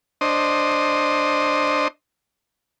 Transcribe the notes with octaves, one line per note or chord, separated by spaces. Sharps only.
D4 C5 D#5